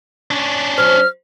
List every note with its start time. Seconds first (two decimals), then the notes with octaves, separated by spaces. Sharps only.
0.31 C#4 D4
0.78 F#3 C5 F6